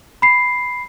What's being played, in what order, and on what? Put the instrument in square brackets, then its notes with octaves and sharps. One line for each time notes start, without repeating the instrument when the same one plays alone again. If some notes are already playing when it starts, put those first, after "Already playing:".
[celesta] B5 C7